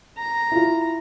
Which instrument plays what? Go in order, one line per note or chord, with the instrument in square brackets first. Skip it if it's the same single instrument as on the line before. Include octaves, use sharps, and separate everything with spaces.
[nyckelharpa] A#5
[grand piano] E4 F4